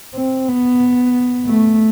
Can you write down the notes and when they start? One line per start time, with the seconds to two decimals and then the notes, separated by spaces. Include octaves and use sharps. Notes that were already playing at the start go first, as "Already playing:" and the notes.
0.15 C4
0.48 B3
1.46 A3